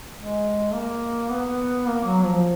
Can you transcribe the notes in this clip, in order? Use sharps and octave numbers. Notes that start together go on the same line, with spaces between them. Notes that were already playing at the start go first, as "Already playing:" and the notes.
G#3
A#3
B3
A#3
F#3
F3